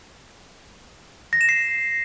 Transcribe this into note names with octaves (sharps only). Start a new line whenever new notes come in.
A#6
E7
C7